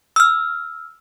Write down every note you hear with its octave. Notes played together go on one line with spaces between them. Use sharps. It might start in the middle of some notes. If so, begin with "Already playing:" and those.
E6 F6